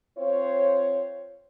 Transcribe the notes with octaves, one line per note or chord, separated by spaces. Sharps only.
C4 F4 C5 C#5